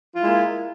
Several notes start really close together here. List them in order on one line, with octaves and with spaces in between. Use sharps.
F4 E4 G#3 A#3